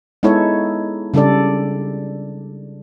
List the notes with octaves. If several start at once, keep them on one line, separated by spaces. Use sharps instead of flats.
G#3 B3 D#4 E4 A4 C#5
C#3 G3 D4 A4 D5